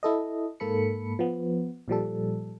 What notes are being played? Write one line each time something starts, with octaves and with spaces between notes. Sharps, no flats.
E4 A4 D#5
G#2 A#3 A4 B5 C#7
F3 B3
A#2 F3 G3 A4